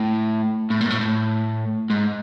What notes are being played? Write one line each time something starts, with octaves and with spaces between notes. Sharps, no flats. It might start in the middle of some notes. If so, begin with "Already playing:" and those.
Already playing: A2
A2
A#2
G#2
A2
A2
G#2